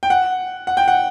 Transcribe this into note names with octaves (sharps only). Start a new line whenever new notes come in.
G5
F#5
F#5
G5
F#5